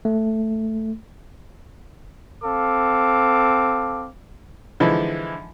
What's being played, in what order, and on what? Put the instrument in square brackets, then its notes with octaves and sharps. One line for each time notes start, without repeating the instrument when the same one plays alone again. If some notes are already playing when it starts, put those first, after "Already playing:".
[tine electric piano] A3
[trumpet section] C4 A4 F5 D6
[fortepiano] D3 E3 F3 G#3 D#4 E4